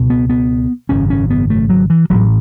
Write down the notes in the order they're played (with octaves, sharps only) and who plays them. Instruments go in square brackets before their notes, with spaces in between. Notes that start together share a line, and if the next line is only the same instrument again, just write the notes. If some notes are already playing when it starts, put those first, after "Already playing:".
Already playing: [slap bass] C#2 B2
B3
B3
G#1 F#2 C#3 C#4
C#4
B3
A3
F#3
E3
A1 A2 F#3